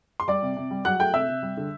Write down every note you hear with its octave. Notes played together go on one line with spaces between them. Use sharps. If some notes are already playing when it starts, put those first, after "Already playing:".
C6
G3 D5 D6
C3
C3
G3
F#3 F#5 F#6
A3 G5 G6
C3 E5 E6
C3
G3
D3